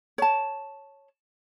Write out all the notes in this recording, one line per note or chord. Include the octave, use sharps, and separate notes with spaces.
C#5 A5